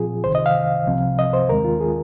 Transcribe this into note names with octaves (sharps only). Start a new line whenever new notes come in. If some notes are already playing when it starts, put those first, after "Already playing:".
Already playing: A#2 F3 C4 F4 G#4
C2 C3 D#3 C5
D#5
F5
C2 C3 F3 C4
D#5
C5
D#2 D#3 G#3 C4 A#4
F4
G#4